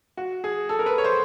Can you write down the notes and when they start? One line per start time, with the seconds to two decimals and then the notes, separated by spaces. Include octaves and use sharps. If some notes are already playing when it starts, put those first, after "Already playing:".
0.17 F#4
0.44 G#4
0.69 A4
0.79 A#4
0.86 B4
0.98 C#5
1.04 C5